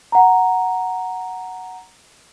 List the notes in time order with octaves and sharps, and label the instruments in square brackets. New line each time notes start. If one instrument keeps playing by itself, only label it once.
[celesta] F#5 A#5